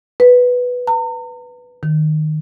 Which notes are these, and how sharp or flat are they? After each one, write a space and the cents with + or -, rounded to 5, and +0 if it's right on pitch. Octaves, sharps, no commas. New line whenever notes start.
B4 +0
A#5 -40
D#3 -15